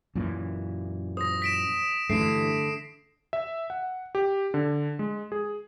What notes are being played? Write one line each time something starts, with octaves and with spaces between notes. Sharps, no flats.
F#2 A#2 E3
C5 D#6 A#6
B6 D7 E7
G2 D3 E3 A3 C7 D7 E7
E5
F#5
G4
D3
G#3
G#4